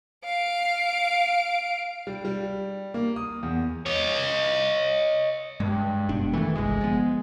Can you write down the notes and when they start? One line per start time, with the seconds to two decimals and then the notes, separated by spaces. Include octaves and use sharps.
0.25 F5 D7
2.07 G3
2.25 G3
2.94 A#3
3.16 D#6
3.43 E2
3.86 C#5 D#5
5.60 G2 G#3
6.09 F#1 B2 D4
6.33 D#3 E3 A3
6.55 G1 C2 G#3
6.81 F3 B3